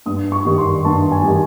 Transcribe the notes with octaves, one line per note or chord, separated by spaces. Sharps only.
G2 D#6
C#6
D#3 G3
C6
G2 A5
G#5
D#3 G3